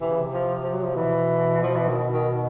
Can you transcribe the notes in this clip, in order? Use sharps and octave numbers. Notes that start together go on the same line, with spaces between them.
C3 E3
C#3
C3
F3
F3
F#3
F3
B2 E3
F3
E3
D#3
D#3